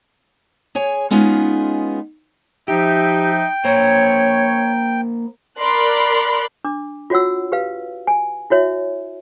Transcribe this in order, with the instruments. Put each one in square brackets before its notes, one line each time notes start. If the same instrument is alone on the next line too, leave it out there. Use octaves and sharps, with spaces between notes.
[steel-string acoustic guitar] G#4 C#5 G#5
G#3 B3 C#4 D#4 F4 G#4
[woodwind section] F3 D#4 E5 [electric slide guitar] G4 [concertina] G5
[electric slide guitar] A#3 C5 [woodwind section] C#5
[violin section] A#4 D5 B5 C6 F#6
[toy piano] D4 D6
F4 F#4 C#5 F#5 E6
G4 B4 F5
G#5
E4 F#4 C#5 E5